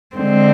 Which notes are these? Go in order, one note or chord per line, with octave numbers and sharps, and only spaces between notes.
D3 G#3 C4